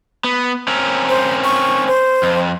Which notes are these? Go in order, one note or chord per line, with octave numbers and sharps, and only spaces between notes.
B3
C4 C#4 A#4
C5
C#6
C5
F2